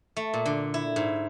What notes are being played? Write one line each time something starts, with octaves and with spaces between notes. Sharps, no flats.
A3
A#2
D3
E4
G#2